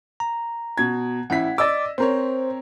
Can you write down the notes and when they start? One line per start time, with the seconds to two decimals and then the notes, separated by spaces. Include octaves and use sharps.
0.20 A#5
0.78 B2 G#6
1.30 A1 E4 F#5 B6
1.58 D5 D#5 D6 E6 A6
1.98 C4 A#4 C5 C#5